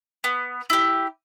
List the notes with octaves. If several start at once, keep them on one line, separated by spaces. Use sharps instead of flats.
B3
E4 G4